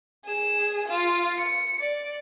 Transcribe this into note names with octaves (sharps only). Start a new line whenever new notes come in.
G#4 E7
F4
C#7
D5